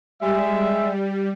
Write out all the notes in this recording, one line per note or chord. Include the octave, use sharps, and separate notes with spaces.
G3 G#3 E5